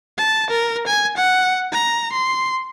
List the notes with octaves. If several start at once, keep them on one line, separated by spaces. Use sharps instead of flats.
A5
A#4
G#5
F#5
A#5
C6